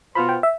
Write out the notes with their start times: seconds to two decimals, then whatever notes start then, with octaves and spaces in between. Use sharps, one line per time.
0.15 B2 B3 F4 C5 B5
0.29 G5
0.43 E5